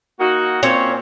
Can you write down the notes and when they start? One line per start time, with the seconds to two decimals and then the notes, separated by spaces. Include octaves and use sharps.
0.20 A#3 D#4 F#4
0.63 A#2 A#3 C4 C#4 C#5